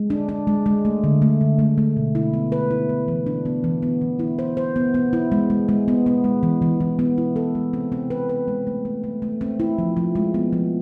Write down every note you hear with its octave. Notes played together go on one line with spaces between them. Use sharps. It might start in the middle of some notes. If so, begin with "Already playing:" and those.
Already playing: G#3
D4
D4
G#3
G#3
A3
D3
A3
D3
A3
A3
B2
E4
B3
B4
E4
B3
E3
D4
B3
E3
B3
E3
E4
C5
C5
B3
B3
E4
G#3
G#3
G#3
B3
B3
G#3
E3
E3
E3
B3
E4
A4
G#3
C4
C4
B4
B4
G#3
A3
A3
A3
A3
C4
E4
F3
F3
G#3
B3
F3